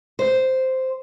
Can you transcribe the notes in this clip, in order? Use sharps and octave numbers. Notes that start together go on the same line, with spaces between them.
C5